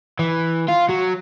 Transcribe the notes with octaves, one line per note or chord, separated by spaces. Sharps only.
E3
F4
F#3